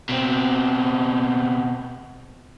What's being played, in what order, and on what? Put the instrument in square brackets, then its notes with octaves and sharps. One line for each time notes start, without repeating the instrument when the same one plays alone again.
[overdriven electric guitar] B2 C4